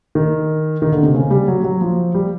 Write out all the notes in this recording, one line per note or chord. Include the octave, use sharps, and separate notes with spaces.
D#3
D#3
D3
C3
C#3
G3
F#3
F#3
F3
G3